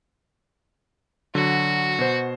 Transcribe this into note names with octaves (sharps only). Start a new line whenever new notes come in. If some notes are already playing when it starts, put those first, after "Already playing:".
D3 F#3 F#4
B2 C5